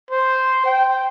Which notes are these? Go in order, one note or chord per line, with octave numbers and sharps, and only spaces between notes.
C5
G5